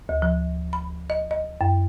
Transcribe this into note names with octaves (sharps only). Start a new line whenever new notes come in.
D2
F3
B5
D#5
D#5
F#2